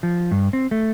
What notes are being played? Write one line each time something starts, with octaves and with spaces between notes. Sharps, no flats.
F3
G2
C4
A3